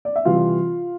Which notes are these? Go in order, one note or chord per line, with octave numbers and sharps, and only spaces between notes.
D5
E5
C3 E3 G3 F4 F5